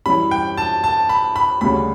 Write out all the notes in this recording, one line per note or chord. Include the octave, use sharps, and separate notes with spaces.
F#2 E3 G3 C#4 E4 B5
G5
A5
A5
B5
B5
D2 C#3 G3 B5